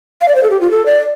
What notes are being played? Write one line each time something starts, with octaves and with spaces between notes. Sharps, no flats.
F5
D5
C5
A4
G4
F4
A4
D5